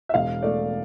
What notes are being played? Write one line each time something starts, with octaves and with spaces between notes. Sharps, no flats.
E5
E1 F5
A3 D5